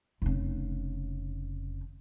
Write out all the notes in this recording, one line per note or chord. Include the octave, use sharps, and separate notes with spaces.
F1 C#3